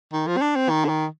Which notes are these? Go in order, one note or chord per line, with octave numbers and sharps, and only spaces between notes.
D#3
F3
C4
D4
C4
D#3
D3
D#3